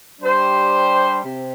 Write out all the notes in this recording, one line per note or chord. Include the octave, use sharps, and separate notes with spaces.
G3 D4 G4 C5
C3